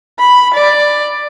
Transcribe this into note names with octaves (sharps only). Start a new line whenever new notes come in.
B5
D5